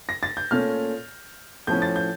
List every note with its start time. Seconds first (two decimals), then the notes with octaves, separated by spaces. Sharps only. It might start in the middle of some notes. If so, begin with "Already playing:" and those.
0.09 A#6
0.23 A6
0.37 G6
0.51 A#2 A3 C#4 F6
1.67 A2 F3 C#4 G6
1.82 A6
1.96 G6